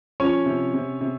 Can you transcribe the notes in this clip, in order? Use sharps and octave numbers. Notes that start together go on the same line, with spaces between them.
F3 C#4 C#5
C3
C3
C3